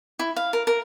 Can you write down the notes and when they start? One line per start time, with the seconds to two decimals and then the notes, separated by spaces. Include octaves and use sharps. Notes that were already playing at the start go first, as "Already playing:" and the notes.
0.19 E4
0.36 F5
0.53 A#4
0.67 A#4